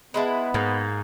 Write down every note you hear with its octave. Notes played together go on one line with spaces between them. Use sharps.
G#3 B3 E4 B4 D#5 A5
G#2 A#3